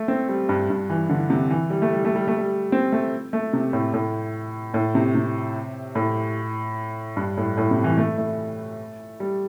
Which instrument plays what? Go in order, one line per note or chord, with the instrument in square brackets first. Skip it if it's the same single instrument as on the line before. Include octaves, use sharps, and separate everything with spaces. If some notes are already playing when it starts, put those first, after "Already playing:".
Already playing: [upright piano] A3
C4
G3
G2
G2
E3
D3
C3
E3
G3
A3
G3
A3
G3
A3
G3
C4
A3
A3
C3
A2
A2
A2
C3
C3
A2
G2
A2
A2
C3
E3
A3
A3
G3